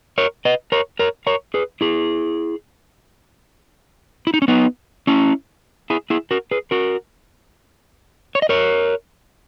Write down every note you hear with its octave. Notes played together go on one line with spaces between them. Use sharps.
A#4 C#5
B4 D#5
A#4 C#5
A#4 C#5
A#4 C#5
G#4 B4
E4 G#4
E4
D#4
C#4
B3 D#4
C#4 E4
E4 G#4
E4 G#4
F#4 A#4
G#4 B4
F#4 A#4
C#5
D#5
A#4 C#5